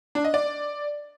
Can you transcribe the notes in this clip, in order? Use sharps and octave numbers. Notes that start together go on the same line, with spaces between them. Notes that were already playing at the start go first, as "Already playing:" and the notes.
D4
D#5
D5